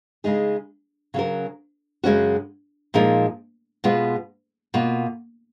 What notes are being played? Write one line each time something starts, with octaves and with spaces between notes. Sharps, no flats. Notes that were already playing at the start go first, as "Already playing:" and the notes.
C#3 G#3 D#4 G#4
C#3 F#3 C#4 F#4 A#4
F#2 C#3 G#3 C#4 F#4
A#2 F3 G#3 D#4 A#4
B2 G#3 B3 F4
B2 A#3 F4